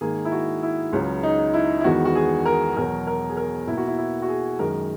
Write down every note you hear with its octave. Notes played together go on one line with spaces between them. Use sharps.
G#2 D#3 A#3 G#4
E4
F#4
E4
C#2 C#3 F#3
D#4
E4
E4
E2 D#3 G#3 B3 F#4
F#4
G#4
A#4
E2 B2 F#3 A#4
A#4
G#4
A#4
B2 A#3 E4
F#4
E4
E4
F#4
G#4
F#2 D#3 G#3 A#4